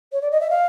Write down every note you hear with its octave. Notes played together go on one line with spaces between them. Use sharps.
C#5
D5
D#5
E5
F5